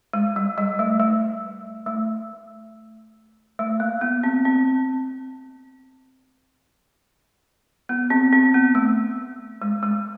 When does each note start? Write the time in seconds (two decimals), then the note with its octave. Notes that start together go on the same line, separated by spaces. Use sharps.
0.14 G#3
0.36 G3
0.58 G3
0.79 A3
1.00 A3
1.86 A3
3.59 A3
3.80 A#3
4.01 B3
4.23 C4
4.45 C4
7.89 B3
8.10 C4
8.33 C4
8.54 B3
8.75 A3
9.62 G#3
9.83 G#3